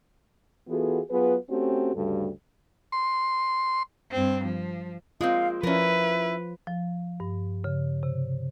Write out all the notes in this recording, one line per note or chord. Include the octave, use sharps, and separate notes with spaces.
E3 B3 F4 F#4 G#4 A4
F#3 B3 F4 G#4 B4
A3 C4 C#4 F#4 G4 A4
D2 G2 C#3 G3 F#4 A4
C6
G2 C4
F3
G#3 A#3 C4 F4 F5
F3 C#4 E4 A#4 B4
F3
G2
C#3
C3